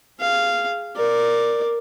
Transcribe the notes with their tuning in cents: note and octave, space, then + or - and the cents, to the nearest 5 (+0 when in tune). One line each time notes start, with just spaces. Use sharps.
G#4 +0 F5 -10
A#4 +0 D5 +0